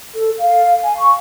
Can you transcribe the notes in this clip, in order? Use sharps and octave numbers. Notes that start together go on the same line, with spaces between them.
A4
F5
G#5
C#6